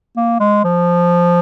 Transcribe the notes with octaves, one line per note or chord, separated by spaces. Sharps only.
A#3
G#3
F3